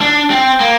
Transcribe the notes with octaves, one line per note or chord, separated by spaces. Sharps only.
D4
C4
A#3